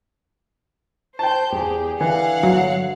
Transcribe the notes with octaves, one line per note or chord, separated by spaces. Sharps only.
C5 G5 A5 G6
E2 G4 G#4
D3 E3 F5 F#5
G1 D3 F#3